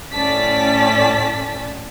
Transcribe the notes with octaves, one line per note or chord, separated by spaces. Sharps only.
A2 C#4 D5 A5 B6